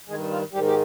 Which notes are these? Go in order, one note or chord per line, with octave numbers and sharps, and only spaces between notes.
G2 D#3 G#3 G#4
F3 F4
G#2 D#3 G3 G4
G4